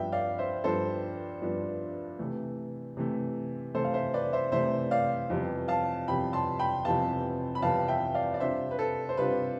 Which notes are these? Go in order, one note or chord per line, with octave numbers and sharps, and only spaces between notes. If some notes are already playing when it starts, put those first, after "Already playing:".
Already playing: G2 F3 B3 D4 E5 G5
D5 F5
C5 E5
G2 F3 B3 D4 A4 C5
G2 F3 B3 D4
C3 E3 A3
C3 E3 A3
C3 E3 A3 A4 C5
F5
C5 E5
B4 D5
C5 E5
C3 E3 A3 C5 E5
D5 F5
F2 C3 E3 G3 B3
F5 A5
F2 C3 E3 G3 B3 G5 B5
A5 C6
G5 B5
F2 C3 E3 G3 B3 F5 A5
B5
F2 C3 E3 G3 B3 F5 A5
E5 G5
D5 F5
D5
C3 G3 D4 F4 C5 E5
B4
A4
C5
C3 G3 D4 F4 B4